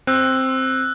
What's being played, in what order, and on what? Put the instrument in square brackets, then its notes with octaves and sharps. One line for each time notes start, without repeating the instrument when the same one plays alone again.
[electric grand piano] C4 [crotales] E6 F#6